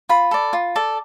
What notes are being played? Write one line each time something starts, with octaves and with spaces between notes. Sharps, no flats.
F4 B5
A4 D5
F4
A4 D5